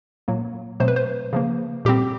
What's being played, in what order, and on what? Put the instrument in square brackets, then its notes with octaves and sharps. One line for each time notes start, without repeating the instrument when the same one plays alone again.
[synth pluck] A#2 F#3 A#3
B2 F#3 A3 C4 C5
B4
C5
C#3 F3 A#3
A#2 G3 C4 G4